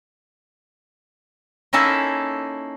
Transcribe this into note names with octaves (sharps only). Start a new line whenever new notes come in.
A#3 C#4 D#4 E4 A4